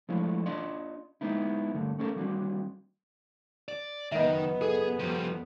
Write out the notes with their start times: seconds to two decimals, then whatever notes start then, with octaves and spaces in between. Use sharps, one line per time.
0.09 F3 G#3 A3 D4 E4 F4
0.46 D4 F4 D5 D#5 C6
1.21 G#3 B3 D#4 E4
1.74 G2 D3 A3
1.99 A3 C#4 E4 F4 A4 A#4
2.15 D#2 G3 C4 D4 F#4
3.69 D5
4.12 F#1 D#3 B3 D#5 E5
4.62 G#4 A4
5.00 F3 G3